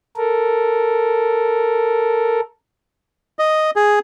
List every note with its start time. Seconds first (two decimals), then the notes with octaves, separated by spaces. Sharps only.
0.17 A4 A#4
3.39 D#5
3.76 G#4